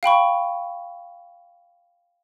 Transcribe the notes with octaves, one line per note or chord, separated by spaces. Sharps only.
F5 G5 B5 C#6